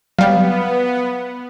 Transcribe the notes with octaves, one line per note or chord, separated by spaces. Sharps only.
F#3 G3 B3 G4 F5